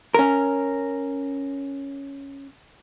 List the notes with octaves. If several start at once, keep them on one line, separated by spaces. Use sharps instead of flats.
C#4 A#4